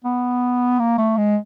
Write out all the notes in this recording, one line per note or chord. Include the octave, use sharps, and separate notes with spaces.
B3
A#3
A3
G#3